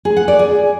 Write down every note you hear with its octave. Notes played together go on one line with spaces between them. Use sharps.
G#4
F#5
D5
G#4